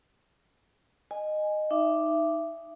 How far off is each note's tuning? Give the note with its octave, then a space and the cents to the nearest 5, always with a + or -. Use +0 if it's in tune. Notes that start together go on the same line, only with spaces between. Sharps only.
D#5 -15 G#5 +0
D#4 +0 E5 +25 D6 +0